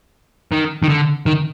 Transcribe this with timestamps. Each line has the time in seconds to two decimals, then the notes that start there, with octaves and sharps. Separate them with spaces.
0.52 D#3
0.83 D#3
0.89 D3
1.26 D#3